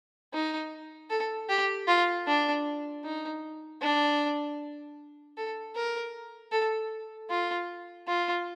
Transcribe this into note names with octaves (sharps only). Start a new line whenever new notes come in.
D#4
A4
G4
F4
D4
D#4
D4
A4
A#4
A4
F4
F4